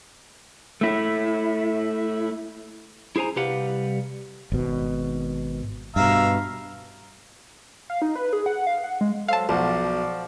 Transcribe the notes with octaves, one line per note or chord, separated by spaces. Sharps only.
A3 E4
E4 G#4 C5 G#5 A#5
C2 G3 G4 B4 F5 F#5
G#1 B2
G2 B2 E5 F5 A#5
F5
D#4
B4
G#4
F#5
F5
F#5
G#3
F#3 A4 C5 F5 A5
B1 F3 F#4 D5